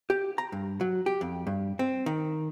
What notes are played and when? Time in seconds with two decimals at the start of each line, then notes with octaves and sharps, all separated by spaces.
0.10 G4
0.38 A#5
0.52 G2
0.81 F#3
1.06 G4
1.21 F2
1.47 G2
1.79 C4
2.06 D#3